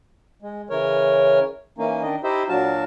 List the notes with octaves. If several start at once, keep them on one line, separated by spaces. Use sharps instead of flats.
G#3
C#3 E3 A#4 C#5
E3 A#3 C#4 D#4
D#3 D4 D#5
D#4 E4 G4 C5 D#5 E5
A#2 F#3 D4 F#4 F5 A5